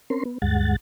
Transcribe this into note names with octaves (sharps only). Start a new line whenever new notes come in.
C4 C#4 A#4 C6
B3
D2 G2 G#3 F#5 A6